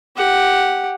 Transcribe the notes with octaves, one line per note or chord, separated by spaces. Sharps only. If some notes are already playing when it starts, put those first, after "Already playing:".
G4 F#5